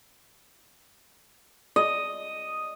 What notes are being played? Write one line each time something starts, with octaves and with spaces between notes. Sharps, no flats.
D#5